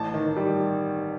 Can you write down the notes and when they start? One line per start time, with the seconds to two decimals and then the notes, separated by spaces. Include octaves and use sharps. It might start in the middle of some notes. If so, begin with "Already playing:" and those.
Already playing: A1 A5
0.14 D#3
0.36 G3